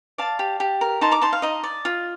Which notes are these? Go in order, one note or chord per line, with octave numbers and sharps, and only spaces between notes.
D5 F5 A5
G4
G4
A#4
D#4 A5 C6
A#5 D6
D#4 A5 C6
F5
D#4 D#5
D5
F4